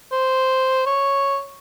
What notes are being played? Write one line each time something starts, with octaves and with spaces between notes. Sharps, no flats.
C5
C#5